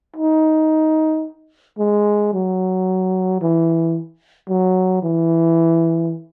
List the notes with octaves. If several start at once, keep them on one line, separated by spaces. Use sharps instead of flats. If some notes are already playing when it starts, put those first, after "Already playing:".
D#4
G#3
F#3
E3
F#3
E3